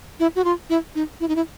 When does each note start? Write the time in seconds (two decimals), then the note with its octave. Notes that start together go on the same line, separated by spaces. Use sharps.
0.20 E4
0.36 F#4
0.44 F4
0.70 E4
0.95 D#4
1.20 E4
1.28 D#4
1.36 E4